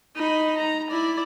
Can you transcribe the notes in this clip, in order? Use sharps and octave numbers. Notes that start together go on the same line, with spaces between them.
D#4 B5
A#5
E4 D5